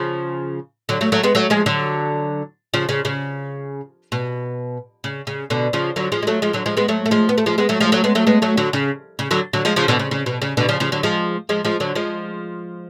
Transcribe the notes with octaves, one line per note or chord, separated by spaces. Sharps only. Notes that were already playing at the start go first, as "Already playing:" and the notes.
Already playing: C#3 F3
D3 F#3
F#3 A3
F#3 A3
G#3 B3
F#3 A3
F3 G#3
D3 F#3
C#3 F3
C#3
C#3
B2
C#3
C#3
B2 D3
C#3 F3
D3 F#3
F3 G#3
G#3
F#3 A3
F3 G#3
D3 F#3
F3 G#3
G#3 B3
F#3 A3
A3
F3 G#3
B3
A3
F3 G#3
G#3 B3
F#3 A3
F3 G#3
F#3 A3
G#3 B3
F#3 A3
G#3 B3
F#3 A3
D3 F#3
C#3
C#3
D3 F#3
D3 F#3
F3 G#3
C#3 F3
B2 D3
C#3
C#3
B2
C#3
B2 D3
C#3 F3
C#3 F3
D3 F#3
F3 G#3
F3 G#3
F3 G#3
D3 F#3
F3 G#3